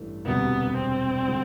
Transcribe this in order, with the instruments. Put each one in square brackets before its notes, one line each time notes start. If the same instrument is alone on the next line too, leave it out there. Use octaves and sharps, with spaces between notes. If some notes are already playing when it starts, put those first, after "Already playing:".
Already playing: [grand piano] A1 G2 E3 A3
[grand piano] E1 D2 C3 G3 [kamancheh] B3
[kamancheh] C4
[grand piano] D3 G3